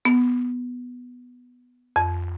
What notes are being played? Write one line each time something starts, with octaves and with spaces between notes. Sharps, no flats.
B3
F2